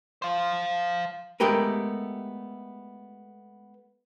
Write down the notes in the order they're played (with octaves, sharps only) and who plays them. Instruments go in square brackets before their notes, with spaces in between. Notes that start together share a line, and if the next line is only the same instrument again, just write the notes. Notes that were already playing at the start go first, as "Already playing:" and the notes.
[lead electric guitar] C5 F5
[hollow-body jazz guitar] G#3 A3 B3 G4 A#4 B4